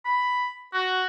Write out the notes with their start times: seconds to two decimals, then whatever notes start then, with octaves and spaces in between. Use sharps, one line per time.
0.05 B5
0.73 F#4